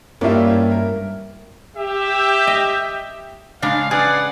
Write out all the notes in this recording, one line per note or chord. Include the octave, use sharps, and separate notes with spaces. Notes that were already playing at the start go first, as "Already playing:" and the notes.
G2 A#3 C#4 E4 F4 G4 D5 E5
E4
A#4
G4 E5
D#5
C#3 G#3 D4 F5
G#4 B4 D5 F#5